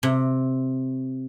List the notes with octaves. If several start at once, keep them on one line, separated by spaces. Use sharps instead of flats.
C3